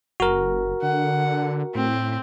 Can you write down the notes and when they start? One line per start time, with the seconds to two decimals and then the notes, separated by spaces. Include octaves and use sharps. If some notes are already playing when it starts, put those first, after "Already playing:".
0.20 F#1 F#4 A#4
0.82 D3 F#5
1.75 A2 C4